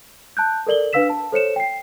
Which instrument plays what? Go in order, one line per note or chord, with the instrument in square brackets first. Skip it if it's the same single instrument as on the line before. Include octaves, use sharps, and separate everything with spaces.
[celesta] A5 F#6 G6
A4 A#4 D5 F#7 G7
D4 B4 F5 E6 B6 E7
A5
A4 C5 C#5 C#7 E7
G5 C7